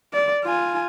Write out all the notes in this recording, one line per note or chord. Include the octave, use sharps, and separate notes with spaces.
D5
F4 G#5